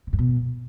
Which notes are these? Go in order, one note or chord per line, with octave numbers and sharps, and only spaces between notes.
C#3
G2
B2